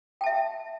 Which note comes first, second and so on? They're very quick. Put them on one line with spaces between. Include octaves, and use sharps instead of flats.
G5 A5 E5